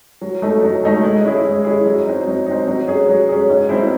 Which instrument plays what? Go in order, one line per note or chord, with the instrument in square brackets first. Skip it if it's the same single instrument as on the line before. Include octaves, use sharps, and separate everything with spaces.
[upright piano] F#3
A3 D#4 A4
F#3
A3 D#4 A4
G#3
C#4 E4 G#4
G#3
C#4 E4 G#4
F#3
C4 D#4
F#3
C4 D#4
F#3
C#4 G#4
F#3
C#4 G#4
G#2
F#3 C4 E4